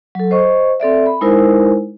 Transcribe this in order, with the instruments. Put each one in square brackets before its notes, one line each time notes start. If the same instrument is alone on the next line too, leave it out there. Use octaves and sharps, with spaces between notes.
[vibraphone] F#3 A4
C5 D#5 C#6
C4 A4 D5 E5
B5
G#3 D#4 E4 A#4 C5 G#5